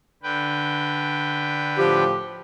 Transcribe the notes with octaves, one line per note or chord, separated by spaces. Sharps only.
D3 B4 G5
A2 F3 G4